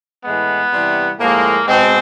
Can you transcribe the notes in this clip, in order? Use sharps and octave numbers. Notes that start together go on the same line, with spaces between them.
A2 E3 G#3 B3
C3 E3 G3
A2 F3 G#3 A#3
B2 G#3 C4